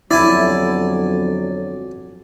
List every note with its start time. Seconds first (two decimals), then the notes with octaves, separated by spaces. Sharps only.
0.11 G1 F2 F#3 E4 D5 G#5 A5